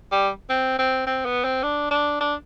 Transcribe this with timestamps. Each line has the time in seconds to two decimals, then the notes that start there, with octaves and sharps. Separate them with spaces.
0.12 G3
0.50 C4
0.79 C4
1.07 C4
1.25 B3
1.44 C4
1.63 D4
1.91 D4
2.20 D4